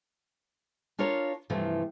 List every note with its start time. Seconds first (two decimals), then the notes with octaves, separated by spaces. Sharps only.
0.98 D4 F4 A#4 C#5
1.50 G2 C3 E3 F3 A3